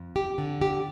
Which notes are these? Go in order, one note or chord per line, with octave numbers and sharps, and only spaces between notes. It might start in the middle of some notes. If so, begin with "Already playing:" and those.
Already playing: F2
G4
D3
G4